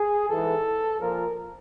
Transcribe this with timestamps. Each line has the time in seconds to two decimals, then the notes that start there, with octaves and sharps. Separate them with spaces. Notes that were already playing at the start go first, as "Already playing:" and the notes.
Already playing: G#4
0.29 G#2 E3 A4
1.00 A#2 F3 A#4